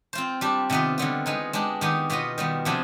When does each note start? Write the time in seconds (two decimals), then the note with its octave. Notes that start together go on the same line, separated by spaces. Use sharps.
0.13 C4 F4 C5
0.41 G3 D4 G4
0.70 C3 D#3 B3 F4 B4
0.98 D3 G3 B3 F4
1.26 G#3 B3 D#4
1.53 G#3 D4 G4
1.81 D#3 B3 D#4 G4
2.10 B2 B3 F4 B4 D#5
2.38 D#3 G3 B3
2.65 C3 F3 B3 D4 G#4